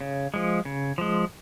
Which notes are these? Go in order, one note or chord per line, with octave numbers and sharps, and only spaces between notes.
C#3
F3 G#3
C#3
F3 G#3